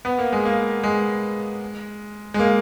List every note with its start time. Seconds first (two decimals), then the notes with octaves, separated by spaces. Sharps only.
0.05 B3
0.19 A#3
0.32 G#3
0.45 A#3
0.84 G#3
2.34 G#3
2.39 A#3